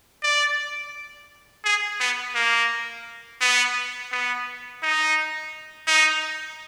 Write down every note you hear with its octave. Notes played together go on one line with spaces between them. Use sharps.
D5
G#4
B3
A#3
B3
B3
D#4
D#4